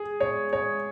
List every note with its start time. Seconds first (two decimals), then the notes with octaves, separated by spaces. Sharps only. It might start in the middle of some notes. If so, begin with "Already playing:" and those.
Already playing: G#4
0.20 C#5
0.53 C#5